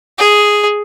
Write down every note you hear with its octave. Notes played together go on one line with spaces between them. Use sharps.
G#4